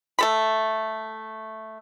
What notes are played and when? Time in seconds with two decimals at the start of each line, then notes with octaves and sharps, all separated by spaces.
0.19 A3 A4 B5